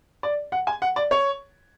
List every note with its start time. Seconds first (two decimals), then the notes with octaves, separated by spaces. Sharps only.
0.23 D5
0.52 F#5
0.67 G#5
0.82 F#5
0.96 D5
1.11 C#5